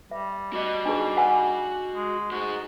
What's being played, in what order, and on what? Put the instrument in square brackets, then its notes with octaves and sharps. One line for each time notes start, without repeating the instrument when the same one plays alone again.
[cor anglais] G3 [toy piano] E5
[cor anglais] G3 [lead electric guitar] F#4 D#5
[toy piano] D4 D#4 G#4
F#5 G#5
[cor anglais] G#3
[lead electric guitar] G#2 G#4 [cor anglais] F#4